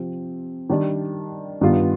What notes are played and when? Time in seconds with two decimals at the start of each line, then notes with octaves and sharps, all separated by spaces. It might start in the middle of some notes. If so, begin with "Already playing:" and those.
Already playing: C3 F3 C4 G4
0.69 D#3 G3 D4
1.61 G2 D#3 G3 B3 F4